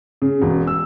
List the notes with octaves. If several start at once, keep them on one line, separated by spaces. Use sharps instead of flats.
C#3
E1
E6